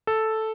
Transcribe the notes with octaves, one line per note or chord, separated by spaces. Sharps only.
A4